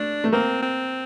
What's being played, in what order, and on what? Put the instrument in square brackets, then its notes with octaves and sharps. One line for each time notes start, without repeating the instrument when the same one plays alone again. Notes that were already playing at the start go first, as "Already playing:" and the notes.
Already playing: [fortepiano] A3 [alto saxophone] D4
[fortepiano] A3
[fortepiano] A#3 [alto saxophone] C4
[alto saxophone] C4